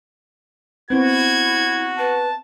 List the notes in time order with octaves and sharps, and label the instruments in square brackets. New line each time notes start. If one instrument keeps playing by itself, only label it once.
[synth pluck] B3 C4 C5 [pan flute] E4 [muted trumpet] F#4 [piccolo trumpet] G#6
[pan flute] B4 [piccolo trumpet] A5